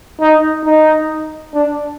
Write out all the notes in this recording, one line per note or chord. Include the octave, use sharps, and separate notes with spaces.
D#4
D#4
D4